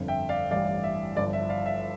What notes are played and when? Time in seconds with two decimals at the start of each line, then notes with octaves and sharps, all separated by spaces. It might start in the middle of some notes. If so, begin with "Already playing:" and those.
Already playing: G1 F2 D3
0.08 E5 G5
0.29 D5 F5
0.51 A1 G2 E3 G3 D5 F5
0.83 E5
1.16 G1 G2 F3 D5
1.33 E5
1.49 D5 F5
1.66 E5